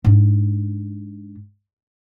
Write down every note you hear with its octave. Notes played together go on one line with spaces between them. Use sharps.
G#2 D4